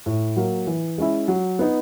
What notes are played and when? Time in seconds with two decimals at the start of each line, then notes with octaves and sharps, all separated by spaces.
0.06 A2
0.36 F#3 A#3
0.67 E3
0.98 G#3 C#4 E4
1.28 F#3
1.59 B3 D#4